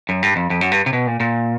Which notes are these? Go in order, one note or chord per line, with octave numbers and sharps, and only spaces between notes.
F#2
G2
F2
F2
F#2
G2
C3
B2
A#2
A#2